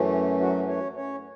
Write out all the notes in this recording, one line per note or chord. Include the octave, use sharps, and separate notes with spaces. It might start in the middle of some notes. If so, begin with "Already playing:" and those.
Already playing: F#2 E3 A3 C#4
F#3 F#4
C#4 C#5
C#4 C#5